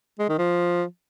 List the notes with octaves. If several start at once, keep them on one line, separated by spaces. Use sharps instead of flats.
G#3
D#3
F3